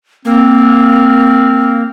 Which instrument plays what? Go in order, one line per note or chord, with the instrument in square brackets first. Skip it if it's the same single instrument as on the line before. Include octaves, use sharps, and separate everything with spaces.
[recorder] A#3 [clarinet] C4